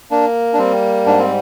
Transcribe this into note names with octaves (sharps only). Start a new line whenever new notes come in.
A#3 D4
D4
G3 C4
G#2 D4
C4